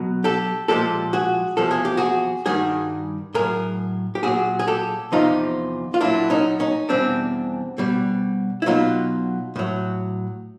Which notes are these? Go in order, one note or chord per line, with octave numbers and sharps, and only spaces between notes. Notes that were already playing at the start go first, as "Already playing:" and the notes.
Already playing: B2 F#3
G4 A4
A#2 F3 G#3 G4 A4
F#4 G#4
E2 C3 F3 A4
G#4
G4
F#4 G#4
G2 D#3 G3 F#4 G#4
A2 F#3 G#4 A#4
G4
A#2 F#3 F#4 G#4
G#4
G4 A4
E2 C3 F3 D#4 F4
F4
A#2 F#3 D4 E4
C#4 D#4
C#4 D#4
E2 B2 G3 C4 D4
B2 G3
E4
B2 F#3 D#4 F4
A2 F#3